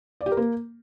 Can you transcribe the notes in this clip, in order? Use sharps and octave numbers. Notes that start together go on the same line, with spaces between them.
D5
G4
A#4
A#3